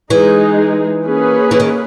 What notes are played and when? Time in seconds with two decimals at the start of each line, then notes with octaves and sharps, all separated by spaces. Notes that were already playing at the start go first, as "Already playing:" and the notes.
0.10 E3 G#3 D#4 G#4
1.04 A#3 C#4 G#4 B4
1.51 E3
1.60 D#3